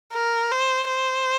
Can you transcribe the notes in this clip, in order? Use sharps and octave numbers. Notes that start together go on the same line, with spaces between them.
A#4
C5
C5